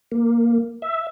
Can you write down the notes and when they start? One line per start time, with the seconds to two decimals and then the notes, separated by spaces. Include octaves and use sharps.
0.12 A#3
0.82 E5